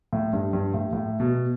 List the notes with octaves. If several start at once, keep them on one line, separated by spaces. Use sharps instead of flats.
A2
G2
G2
A2
A2
B2